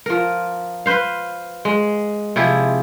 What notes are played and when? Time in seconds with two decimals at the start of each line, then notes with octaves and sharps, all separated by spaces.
0.06 F3 A#4
0.86 B4 C5 F5
1.65 G#3
2.36 C3 F3 E4 G#4